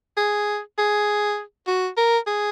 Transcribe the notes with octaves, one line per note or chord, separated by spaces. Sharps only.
G#4
G#4
F#4
A#4
G#4